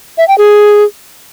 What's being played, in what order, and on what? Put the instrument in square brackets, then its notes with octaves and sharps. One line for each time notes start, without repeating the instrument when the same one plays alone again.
[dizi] E5
G5
G#4